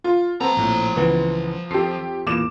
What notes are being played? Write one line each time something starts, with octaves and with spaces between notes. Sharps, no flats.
F4
F3 B3 C4 A4 A#5
A#1 A2
C#2 E3 B3
F2 G4 A4 C7
E2 A#2 D6 E7